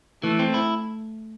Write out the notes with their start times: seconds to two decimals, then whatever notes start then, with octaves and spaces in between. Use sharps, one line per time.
0.23 E3 A3
0.39 C4
0.54 E4